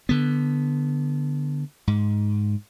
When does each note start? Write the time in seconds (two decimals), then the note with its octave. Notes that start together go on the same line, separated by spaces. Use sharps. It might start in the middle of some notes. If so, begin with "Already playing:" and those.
0.09 D3 B3
1.87 G#2